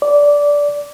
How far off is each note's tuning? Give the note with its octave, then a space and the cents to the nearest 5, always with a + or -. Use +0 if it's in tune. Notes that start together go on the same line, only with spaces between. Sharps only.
D5 -15